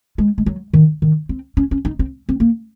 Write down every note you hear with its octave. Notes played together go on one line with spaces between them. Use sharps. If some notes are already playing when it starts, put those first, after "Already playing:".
G#3
G#3
F#3
D#3
D#3
C4
C#4
C#4
D#4
C4
C4
A#3